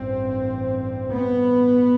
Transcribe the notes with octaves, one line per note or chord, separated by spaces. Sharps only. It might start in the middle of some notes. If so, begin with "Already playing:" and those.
Already playing: A1 G2 C4
B3